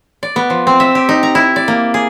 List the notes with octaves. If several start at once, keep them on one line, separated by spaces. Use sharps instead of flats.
D5
B3
F3
C4
E5
G4
D#4
A#5
E4
D5
A#3
G#4